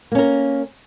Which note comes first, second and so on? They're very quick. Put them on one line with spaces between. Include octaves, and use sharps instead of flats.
A#3 C#4 A#4